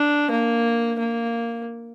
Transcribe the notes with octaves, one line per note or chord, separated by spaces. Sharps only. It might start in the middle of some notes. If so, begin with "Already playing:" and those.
Already playing: D4
A#3
A#3